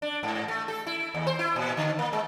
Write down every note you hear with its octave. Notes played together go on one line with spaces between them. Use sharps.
D4
G#2
A3
A4
E4
D#2
C5
E4
A#2
D3
A#3
G#3